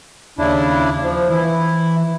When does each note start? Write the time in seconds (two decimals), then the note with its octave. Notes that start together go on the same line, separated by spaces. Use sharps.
0.38 D#2 C#3 D4 E4
1.03 F3
1.30 E3 E4